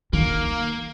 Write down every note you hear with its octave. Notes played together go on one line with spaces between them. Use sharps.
D#3 A#3